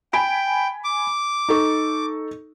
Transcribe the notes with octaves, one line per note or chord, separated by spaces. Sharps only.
G5 G#5 B5 D7
D6
D#4 A4 C#6